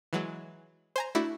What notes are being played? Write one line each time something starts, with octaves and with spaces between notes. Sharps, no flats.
E3 F#3 G#3
C5 G#5 A#5
A3 D4 E4 F#4